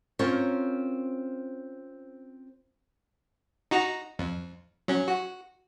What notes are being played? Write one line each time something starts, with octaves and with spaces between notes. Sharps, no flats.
C4 C#4 F4 A#4 C5 C#5
D#4 F#4 A#5
F2
F#3 C#4
F#4